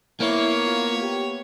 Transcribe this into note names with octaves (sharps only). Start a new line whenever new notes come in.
A#3 B3 E4 C#5
F4
G4